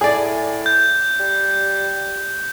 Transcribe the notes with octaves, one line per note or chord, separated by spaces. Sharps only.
A2 G#4 D5
G6
G3